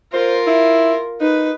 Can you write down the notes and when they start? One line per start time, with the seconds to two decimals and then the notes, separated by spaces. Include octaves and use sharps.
0.13 F4 A#4 C5
0.47 E4
1.20 D#4 B4